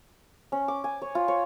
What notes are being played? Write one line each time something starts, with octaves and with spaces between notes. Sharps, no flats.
C#4
D6
G#5
C#5
F4
C#5